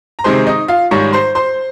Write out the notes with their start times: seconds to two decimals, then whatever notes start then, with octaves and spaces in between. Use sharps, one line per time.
0.19 A#5
0.24 C3 D#3 G#3 C5 C6
0.47 D#4 D#5
0.68 F4 F5
0.91 G#2 D#3 G3 C#5 C#6
1.13 C5 C6
1.35 C5 C6